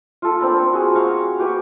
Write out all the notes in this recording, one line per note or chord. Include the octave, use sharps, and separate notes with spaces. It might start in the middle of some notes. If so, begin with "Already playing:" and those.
F4 A4
C4 D4 A#4 B5
F#4 G#4
F5 A#5 C#6
F#4 G4 B4 C#6